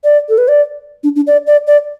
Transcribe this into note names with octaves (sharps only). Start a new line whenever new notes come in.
D5
A4
B4
D5
D4
D4
D5
D5
D5